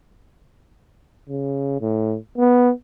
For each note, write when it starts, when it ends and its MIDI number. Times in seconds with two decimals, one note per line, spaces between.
1.29 1.80 49
1.81 2.17 45
2.38 2.71 59